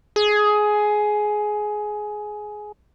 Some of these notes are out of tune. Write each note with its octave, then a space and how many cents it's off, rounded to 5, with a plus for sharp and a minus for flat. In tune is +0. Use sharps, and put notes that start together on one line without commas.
G#4 +15